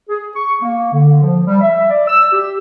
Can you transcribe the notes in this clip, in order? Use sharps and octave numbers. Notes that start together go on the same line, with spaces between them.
G#4
C#6
A#3
D3
F3
G3
E5
D5
E6
G4